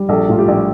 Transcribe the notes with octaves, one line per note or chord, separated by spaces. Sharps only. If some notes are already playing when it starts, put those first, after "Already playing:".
Already playing: G3
A#1 A4
A2 F4
G4
A#1